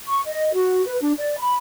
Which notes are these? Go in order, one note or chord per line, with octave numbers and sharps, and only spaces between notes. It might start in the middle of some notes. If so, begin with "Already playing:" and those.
C#6
D#5
F#4
B4
D4
D5
B5